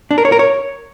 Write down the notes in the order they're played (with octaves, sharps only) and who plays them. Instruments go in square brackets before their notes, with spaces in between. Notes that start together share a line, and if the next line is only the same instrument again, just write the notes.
[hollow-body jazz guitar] D4
A#4
C#5
A#4
C#5